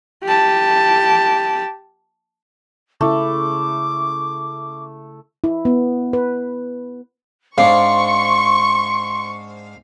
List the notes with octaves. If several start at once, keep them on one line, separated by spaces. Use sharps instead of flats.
G4 A5
C#3 A3 E4 D6
E4
B3
B4
G#2 C4 D4 F5 C6 C#6